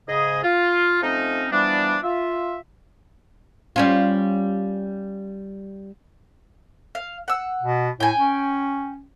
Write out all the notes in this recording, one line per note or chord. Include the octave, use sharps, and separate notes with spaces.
G#2 C#3 G#4 D#5
F4
F3 A3 C4 C#4 D#4
E3 F3 G3 B3 D4
F4 E5
G3 C#4 F4
F5
F#5 E6
B2
A2 G5 G#5
C#4